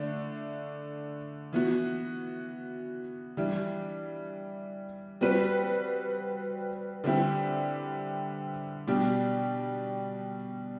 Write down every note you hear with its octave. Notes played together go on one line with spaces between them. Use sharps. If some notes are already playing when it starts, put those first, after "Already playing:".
Already playing: D3 A3 D4
E3 B3 F#4
E3 G3 D4
G3 C4 F#4 B4
D3 G3 C4 E4 G4
B2 G3 D4 G4